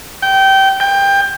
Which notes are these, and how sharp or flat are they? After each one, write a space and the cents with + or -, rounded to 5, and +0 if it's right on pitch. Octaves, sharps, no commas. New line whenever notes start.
G5 -20
G5 +20